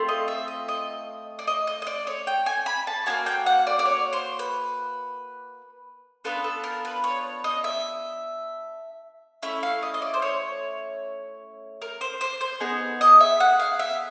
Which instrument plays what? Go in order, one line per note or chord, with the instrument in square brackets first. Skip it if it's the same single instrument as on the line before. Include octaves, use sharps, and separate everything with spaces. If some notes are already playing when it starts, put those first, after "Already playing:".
Already playing: [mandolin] A3 C4 F4
D#5
E5
D#5
D#5
D5
D#5
D#5
D#5
D5
C#5
G5
G#5
B5
A5
A#3 D4 F#4 G#5
G5
F#5
D5
D5
C#5
C5
B4
B3 D4 F4 A4 B4
A4
A#4
B4
C#5
D#5
E5
A3 C#4 E4 E5
F5
D#5
D#5
D5
C5
C#5
A#4
C5
C5
C5
B3 D#4 G#4
D#5
E5
F#5
F5
E5